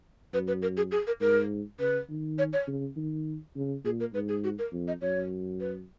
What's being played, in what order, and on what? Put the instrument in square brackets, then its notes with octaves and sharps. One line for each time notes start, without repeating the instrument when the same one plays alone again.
[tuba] F#2 [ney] B4
[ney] B4
A#4
G#4
G#4
A#4
[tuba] G#2 [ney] A#4
[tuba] C#3 [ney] B4
[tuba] D#3
[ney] C#5
C#5
[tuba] C#3
D#3
C#3
[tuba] A#2 [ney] G#4
[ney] A#4
[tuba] G#2 [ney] B4
[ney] G#4
F#4
A#4
[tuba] F2
[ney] D#5
[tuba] F#2 [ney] C#5
[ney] B4